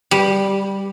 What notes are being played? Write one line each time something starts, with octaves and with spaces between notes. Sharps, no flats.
G3